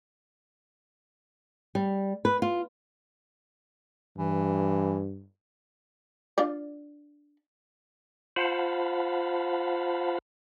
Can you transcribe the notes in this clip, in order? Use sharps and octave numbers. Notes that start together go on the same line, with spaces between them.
G3
B4
F4
G2 E3
D4 F4 D5
F4 C5 F5 F#5 A5 B5